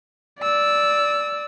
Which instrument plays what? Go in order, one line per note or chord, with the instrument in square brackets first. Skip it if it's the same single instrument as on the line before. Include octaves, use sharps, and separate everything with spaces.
[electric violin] D5 E6